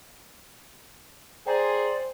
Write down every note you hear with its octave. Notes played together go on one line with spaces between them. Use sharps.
G#4 C5 D5 G5 A#5